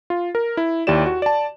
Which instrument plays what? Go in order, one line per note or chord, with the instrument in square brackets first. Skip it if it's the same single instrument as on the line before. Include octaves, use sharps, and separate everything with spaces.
[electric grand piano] F4
A#4
E4
D#2 E4 G4 D5 E7
F#4
D5 A5